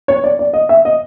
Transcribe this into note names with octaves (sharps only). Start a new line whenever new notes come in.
C#5
D5
D5
D#5
E5
D#5